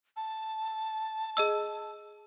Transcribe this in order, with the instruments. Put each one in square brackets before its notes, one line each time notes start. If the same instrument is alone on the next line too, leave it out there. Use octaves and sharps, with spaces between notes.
[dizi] A5
[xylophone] G#4 D#5 E6